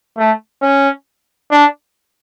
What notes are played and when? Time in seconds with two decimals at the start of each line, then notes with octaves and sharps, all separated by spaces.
0.18 A3
0.62 C#4
1.51 D4